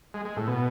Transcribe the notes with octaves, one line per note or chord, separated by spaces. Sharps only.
G#3
G#3
A2
B2